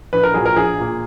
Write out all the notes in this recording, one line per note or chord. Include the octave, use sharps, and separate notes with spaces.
A#1 B4
A#4
A#2 F#3 G#4
A#4
A#1 G#4
A#2 A#3